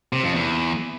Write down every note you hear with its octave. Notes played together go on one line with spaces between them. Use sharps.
C3
F2
E2